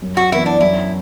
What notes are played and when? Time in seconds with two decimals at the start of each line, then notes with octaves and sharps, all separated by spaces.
0.02 F#2
0.17 F#4
0.32 E3 B3 E4
0.46 D4
0.61 F#2 E4